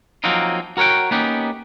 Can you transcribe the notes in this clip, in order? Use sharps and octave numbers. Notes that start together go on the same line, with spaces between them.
F3 F#3 A#3 C4 D#4
F#4 A#4 C#5 F#5 G5
A#3 B3 C#4 D#4 G4